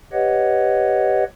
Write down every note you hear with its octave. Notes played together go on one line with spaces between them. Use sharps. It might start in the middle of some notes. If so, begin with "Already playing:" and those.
G4 B4 C#5 D#5 F#5